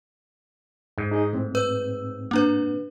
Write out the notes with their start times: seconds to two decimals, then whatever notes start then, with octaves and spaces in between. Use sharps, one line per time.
0.98 G#2
1.11 D#4 G#4 D#5
1.33 A2 C4
1.55 B4 E6
2.31 A#3 D4 B4